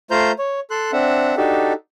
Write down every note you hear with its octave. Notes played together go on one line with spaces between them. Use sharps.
A3 F4 C5 A#5 G6
C#5
A4 C6 F#6
C4 D4 E5 F#5
D4 D#4 F#4 G4 A4